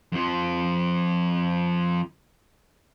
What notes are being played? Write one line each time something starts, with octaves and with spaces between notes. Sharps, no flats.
F2 F3